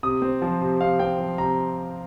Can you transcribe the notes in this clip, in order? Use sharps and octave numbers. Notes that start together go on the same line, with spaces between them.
C3 D#6
C4
F3
C3
C3 F5
C4 G5
F3
C3 A#5